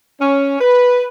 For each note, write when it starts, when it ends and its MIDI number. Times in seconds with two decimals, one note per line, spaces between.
0.21 0.56 61
0.60 1.06 71